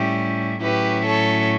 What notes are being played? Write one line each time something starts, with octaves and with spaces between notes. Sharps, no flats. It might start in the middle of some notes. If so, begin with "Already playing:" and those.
Already playing: A2 G3 C#4 E4 G4
A2 F#3 C#4 E4 G4 B4
A4 C#5